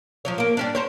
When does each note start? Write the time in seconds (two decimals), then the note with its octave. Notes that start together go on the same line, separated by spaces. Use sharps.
0.25 F3 F#3 C#5
0.38 A#3 A#4
0.57 G3 C#4 D4
0.75 A#4 C5 C#5